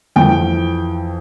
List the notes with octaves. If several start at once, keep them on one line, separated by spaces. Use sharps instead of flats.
F2 E3 G5